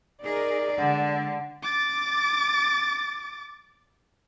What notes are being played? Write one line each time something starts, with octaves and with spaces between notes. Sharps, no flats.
D#4 G#4 A#4 D5
D3 G#3 F#5
D6 A6